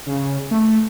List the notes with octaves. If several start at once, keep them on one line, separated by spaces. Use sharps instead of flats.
C#3
A3